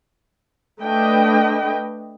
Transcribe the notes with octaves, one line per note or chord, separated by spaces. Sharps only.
A3 D4 B4 D#5 G5